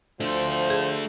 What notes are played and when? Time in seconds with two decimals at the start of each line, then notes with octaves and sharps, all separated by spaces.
0.20 F3 A3 D4 C5
0.70 G#4